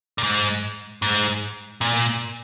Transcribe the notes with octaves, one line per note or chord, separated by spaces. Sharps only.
A#2
G#2
G#2
A#2